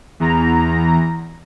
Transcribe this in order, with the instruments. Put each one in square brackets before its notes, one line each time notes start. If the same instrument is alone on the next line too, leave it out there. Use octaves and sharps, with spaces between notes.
[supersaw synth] E2 A#5